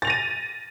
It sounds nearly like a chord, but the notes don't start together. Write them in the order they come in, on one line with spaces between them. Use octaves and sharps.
A6 F7 A#6 D#7